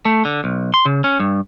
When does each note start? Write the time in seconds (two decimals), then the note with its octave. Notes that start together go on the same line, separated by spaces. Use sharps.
0.05 A3
0.25 D3
0.44 B1
0.74 C6
0.85 C#3
1.04 C#4
1.20 G2